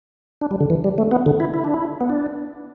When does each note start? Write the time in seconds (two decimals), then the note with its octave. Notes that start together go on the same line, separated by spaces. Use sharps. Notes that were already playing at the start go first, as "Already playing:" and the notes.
0.41 D4
0.51 G3
0.60 D3
0.70 E3
0.84 G3
0.98 A3
1.11 B3
1.26 D3
1.40 E4
1.54 E4
1.64 D4
1.74 E4
2.01 B3
2.10 D4